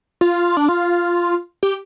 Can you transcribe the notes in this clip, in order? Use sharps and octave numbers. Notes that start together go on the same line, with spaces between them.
F4
D4
F4
G4